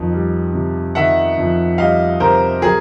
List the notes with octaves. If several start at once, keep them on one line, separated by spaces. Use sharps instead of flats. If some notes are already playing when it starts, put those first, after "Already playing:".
Already playing: F2 D#3
G3
C3
D#3 E5 F#5
F2
G3 D#5 F5
C3 A#4 C5
F#3 G#4 A#4